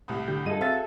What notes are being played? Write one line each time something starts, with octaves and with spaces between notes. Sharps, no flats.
C2 A2
D3 G4 G6
G2 F4 G#4 A4 D#5 D#7
C4 F#4 E5 F5 A6